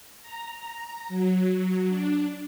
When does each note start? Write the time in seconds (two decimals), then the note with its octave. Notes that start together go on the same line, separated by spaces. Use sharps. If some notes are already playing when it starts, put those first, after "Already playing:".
0.22 A#5
1.08 F#3
1.88 D4